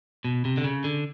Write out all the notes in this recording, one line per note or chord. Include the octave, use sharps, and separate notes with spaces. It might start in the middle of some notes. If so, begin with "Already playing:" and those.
B2
C3
D3
C#3
D3